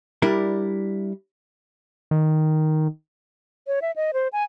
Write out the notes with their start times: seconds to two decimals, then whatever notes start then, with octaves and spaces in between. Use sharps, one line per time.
0.22 G3 D4 E4 A#4
2.11 D#3
3.67 C#5
3.82 E5
3.96 D#5
4.13 C5
4.33 G#5